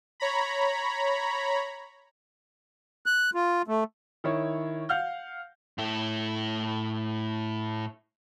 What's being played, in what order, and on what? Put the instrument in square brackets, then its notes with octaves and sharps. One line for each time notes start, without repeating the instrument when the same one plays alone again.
[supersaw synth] C#5 A#5 B5
[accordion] F#6
F4
A3
[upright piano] D#3 E4 C#5
F5 F#5 F6 G6
[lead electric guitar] A2 E4